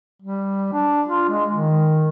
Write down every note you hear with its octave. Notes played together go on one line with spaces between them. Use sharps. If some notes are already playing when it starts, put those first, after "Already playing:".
G3
D4
F4
G#3
D#3